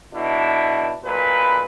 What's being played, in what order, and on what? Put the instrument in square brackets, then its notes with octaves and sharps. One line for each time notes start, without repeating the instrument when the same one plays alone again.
[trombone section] B1 B2 D4 E4
B1 A#2 B4